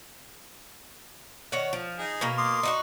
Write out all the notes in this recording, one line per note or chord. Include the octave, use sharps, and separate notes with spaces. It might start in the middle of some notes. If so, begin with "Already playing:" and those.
D#3 C#5 F#5
F3
D#4 G#4
B2 A#3 A#4
C6 D6 D#6
D#4 F4 F#4